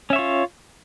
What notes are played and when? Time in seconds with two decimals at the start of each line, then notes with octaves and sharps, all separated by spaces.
0.10 C#4
0.13 E5
0.16 C#5
0.19 F4